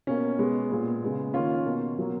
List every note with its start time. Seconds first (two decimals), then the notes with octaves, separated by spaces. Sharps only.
0.07 B2 A#3 C#4
0.38 B2 G#3 B3
0.70 A#2 G#3 B3
1.02 C#3 G#3 B3
1.34 D#3 A#3 C#4 F4
1.65 B2 A#3
1.97 B2 F#3 A#3